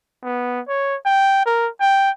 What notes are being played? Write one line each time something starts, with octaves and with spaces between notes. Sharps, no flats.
B3
C#5
G5
A#4
G5